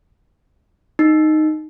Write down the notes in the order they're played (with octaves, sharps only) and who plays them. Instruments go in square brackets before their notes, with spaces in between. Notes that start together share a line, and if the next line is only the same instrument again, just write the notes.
[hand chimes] D#4